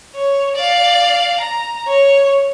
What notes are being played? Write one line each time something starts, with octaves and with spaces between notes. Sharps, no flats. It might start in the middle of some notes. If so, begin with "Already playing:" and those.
C#5
D5 F5
A#5
C#5